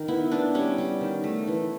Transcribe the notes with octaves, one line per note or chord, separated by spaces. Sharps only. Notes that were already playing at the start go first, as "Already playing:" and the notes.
Already playing: D#3
B3 E4
B3 D4
G3 C#4
G3
D#3
A3
E3